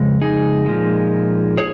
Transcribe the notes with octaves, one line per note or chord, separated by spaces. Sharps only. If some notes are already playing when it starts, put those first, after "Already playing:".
Already playing: F2 C#3 G#3
D#4 G#4
A#2 F3 G#3
G#4 C#5